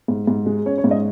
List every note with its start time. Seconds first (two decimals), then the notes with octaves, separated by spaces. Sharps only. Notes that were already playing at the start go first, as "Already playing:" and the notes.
0.08 G#2
0.27 G#2
0.46 G#3
0.66 C#4 C#5
0.78 C#5
0.84 G#2
0.91 D#5